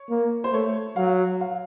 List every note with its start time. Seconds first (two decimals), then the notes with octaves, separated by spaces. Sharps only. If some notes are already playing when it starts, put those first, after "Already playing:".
Already playing: C#5
0.09 A#3
0.44 C5
0.52 A3 C#5
0.96 F#3 F5
1.41 F5